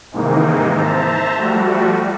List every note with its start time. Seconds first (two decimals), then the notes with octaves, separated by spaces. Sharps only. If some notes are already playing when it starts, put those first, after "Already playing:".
0.12 G#2 C3 D#3 E3 A#3 D#4
0.75 C5 E5 A5 A#5
1.37 F3 G3 A3 F#4